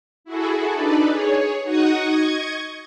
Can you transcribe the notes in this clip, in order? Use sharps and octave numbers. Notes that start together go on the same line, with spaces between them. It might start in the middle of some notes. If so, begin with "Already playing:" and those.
E4 F#4 G#4 A4
D4 D#4 A4 B4 D5
G#4 C#5
D#4 F#4 F#5 C#6 D#6
D#5 C#6 G#6